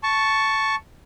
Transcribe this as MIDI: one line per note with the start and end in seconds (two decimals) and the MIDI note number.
0.03 0.75 81
0.03 0.75 85